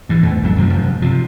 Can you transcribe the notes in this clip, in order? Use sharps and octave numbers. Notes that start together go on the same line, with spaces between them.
G2 E3
E2 A3
G#1 F#3 A3
F#2 C3 D#3 F3
F1 G2
C3 F3